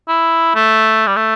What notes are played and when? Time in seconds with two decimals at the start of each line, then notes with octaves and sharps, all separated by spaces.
0.08 E4
0.55 A3
1.07 G3
1.16 A3